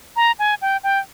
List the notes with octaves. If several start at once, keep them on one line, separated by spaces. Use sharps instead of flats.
A#5
G#5
G5
G5